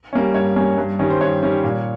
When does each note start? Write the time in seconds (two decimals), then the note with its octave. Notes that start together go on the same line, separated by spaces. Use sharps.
0.13 G3 A#3 C#4
0.34 G2 C#5
0.56 G3 A#3 C#4
0.78 G2
0.99 D#3 G3 C#4
1.10 C5
1.21 G2 C#5
1.43 D#3 G3 C#4
1.64 A#2